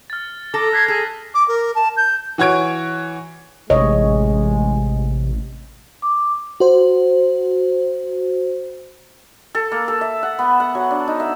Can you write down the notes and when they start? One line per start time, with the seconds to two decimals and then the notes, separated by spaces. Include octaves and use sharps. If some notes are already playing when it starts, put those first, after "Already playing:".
0.10 F6 A6
0.54 A4 A#5 D6
0.73 F#6 G#6 B6 C7
0.88 G#4 A4
1.35 D6
1.48 A#4
1.75 A5
1.97 G6
2.38 E3 F#4 C#5 G#6 D7
3.70 A1 C3 G#3 C#5 D#5
6.02 D6
6.60 F#4 C5
9.55 A4
9.72 A#3
9.88 A4
10.01 E5
10.23 F#5
10.39 B3
10.60 F#5
10.75 F#3
10.91 D4
11.07 D#4
11.20 E5